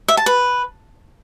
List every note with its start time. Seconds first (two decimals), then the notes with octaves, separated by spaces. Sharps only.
0.08 E5
0.17 A5
0.26 B4